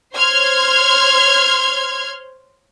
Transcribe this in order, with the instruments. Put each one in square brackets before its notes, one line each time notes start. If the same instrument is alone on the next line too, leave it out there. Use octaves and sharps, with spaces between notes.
[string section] C5 C#5 C6 F6 G#6